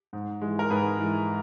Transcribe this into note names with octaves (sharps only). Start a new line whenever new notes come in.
G#2
E3 G#3
A#4
G#2 G#4 B4
E3 G#3